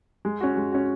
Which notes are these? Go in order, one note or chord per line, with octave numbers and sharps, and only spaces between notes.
G#3
C#4 F#4
G#3
C#4 F#4